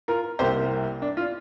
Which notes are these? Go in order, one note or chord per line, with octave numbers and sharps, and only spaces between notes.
F4 A#4
C2 C3 A#3 G4 C5
D4
F4